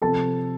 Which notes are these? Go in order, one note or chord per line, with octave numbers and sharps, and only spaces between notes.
C3 F3 C4 A4 A5